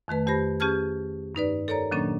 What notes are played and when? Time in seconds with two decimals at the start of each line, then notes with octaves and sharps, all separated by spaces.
0.08 F2 D#3 A3 B4
0.26 F2 G4 C5 B5 A#6
0.60 C#4 G4 G#4 A5 F6 G#6
1.35 G2 D#4 B4 D5
1.68 A4 A#4 C#5 D5 A#5
1.91 A#2 D#3 F#3 A#3 C#4 D4